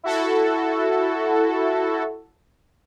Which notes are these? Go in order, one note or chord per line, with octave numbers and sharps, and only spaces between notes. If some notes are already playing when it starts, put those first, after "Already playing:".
E4 F#4 A4